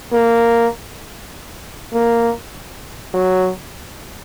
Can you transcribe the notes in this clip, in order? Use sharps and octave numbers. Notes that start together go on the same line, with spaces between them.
A#3
A#3
F#3